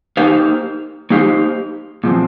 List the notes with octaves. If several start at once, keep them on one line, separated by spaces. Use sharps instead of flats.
A#3 D#4 G4 C5 F5
A#3 D#4 G4 C5 F5
A#2 F3 C4